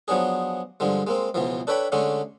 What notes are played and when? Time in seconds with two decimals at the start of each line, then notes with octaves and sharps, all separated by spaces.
0.08 F3 F#3 B3 D4 G#4
0.80 G2 D3 F3 G#3
1.07 G#3 A#3 C4
1.34 C#2 B2 E3 F3
1.67 D4 A4 B4 C#5 G5 B5
1.92 D3 G#3 A3 C#4 D4